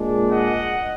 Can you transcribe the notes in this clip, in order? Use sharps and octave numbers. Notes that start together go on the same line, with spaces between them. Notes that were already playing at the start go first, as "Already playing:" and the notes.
Already playing: A#2 G#3 D4
D#5 F#5